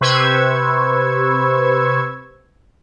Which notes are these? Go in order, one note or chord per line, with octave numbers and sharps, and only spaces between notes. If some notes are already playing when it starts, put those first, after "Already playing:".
C3 B4 C5 C#6 E6 G#6